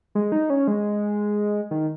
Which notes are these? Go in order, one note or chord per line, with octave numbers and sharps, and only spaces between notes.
G#3
D#4
C#4
G#3
D#3